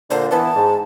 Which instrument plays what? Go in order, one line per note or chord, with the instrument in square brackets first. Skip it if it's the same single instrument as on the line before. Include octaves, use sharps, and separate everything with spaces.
[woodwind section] A#2 D3 [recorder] C5
[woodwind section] E3 B3 [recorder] A5
[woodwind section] G#2